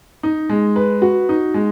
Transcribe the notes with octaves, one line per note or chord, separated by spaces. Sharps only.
D#4
G#3
B4
F#4
D#4
G#3